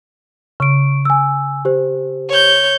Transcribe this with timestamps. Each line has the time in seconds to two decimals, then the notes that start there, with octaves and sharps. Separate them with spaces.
0.60 C#3 C#6 D7
1.05 G#5 E6
1.65 G4 C5
2.29 C#5 G6